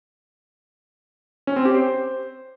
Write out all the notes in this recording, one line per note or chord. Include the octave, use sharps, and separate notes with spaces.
C#4
C4
G4
C5